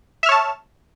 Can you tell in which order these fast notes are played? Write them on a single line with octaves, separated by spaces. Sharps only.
E5 F6 C#5 A5